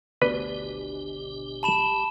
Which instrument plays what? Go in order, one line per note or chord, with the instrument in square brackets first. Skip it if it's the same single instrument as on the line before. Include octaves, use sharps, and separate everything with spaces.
[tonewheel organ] G#1 G4 [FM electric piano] D2 B2 D4 [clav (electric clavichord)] B4
[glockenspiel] A5 B5 E7